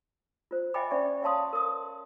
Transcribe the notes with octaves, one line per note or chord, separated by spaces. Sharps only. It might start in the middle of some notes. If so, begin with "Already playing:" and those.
F4 C5
D#5 E5 G5 G#5 B5 D6
C#4 C5 D5 E5 C#6
C#5 E5 F5 A5 C6 D#6
A#4 D#6